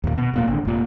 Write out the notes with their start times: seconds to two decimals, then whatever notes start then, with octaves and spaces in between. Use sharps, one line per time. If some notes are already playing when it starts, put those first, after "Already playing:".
0.04 D#2 A#2
0.18 B2
0.34 E1 A#2 A#3
0.48 G#1 D3
0.65 F1 A#2